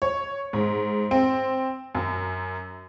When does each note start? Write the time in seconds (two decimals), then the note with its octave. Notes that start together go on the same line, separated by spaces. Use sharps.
0.02 C#5
0.53 G#2
1.11 C4
1.95 F#2